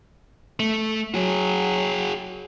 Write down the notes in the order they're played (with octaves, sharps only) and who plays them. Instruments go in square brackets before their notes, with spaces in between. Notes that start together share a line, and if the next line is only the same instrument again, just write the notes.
[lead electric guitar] A3
[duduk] F#3 [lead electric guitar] F#4 G#4